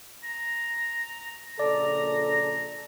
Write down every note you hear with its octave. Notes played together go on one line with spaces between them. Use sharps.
A#5
A#1 C#3 A4 D5 A#5